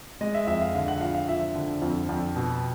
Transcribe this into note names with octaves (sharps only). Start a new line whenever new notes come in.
G#3 D#5
E5
F2 E5
F5
D3 F5
F#5
F3 F5
F5
F3 E5
D3
F2
F2
B2